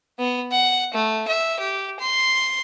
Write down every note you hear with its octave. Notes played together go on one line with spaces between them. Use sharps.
B3
F#5
A3
E5
G4
C6